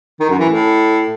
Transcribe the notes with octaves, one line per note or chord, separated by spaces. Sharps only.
D#3
F#2
E3
A2